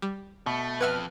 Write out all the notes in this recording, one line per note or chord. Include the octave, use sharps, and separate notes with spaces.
G3
B2 A3
F2 B4 E5 F#5 F6 G#6